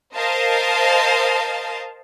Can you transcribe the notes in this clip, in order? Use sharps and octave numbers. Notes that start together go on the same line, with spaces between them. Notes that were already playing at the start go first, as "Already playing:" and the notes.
A#4 C5 D#5 F5 A5